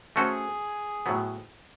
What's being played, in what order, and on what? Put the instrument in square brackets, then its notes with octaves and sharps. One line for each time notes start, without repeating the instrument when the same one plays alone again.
[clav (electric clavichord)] A3 C#4 F#4 A4 C5 [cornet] G#4
[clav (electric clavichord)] A2 F#3 B3